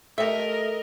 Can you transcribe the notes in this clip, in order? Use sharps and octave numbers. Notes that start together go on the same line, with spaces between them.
A3 G4 A#4 D#5 E5